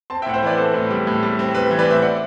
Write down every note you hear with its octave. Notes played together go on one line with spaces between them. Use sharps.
C4 A5 C6
E5 G5
A2 F#5
C5 E5
E3 B4 D5
C4 A4 C5
A2
G3
A2
G3
C4
G3 B4
B4
E3
B4 D5
A2 C5 E5
D5 F#5